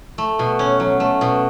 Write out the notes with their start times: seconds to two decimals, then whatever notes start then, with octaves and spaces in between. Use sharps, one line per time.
0.18 A3
0.39 B2
0.59 C#4
0.80 F#3
1.00 A3
1.21 B2